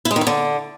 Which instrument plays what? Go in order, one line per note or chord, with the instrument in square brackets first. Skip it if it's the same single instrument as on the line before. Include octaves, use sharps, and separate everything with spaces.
[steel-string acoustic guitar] E4
G#3
D#3
E4
D3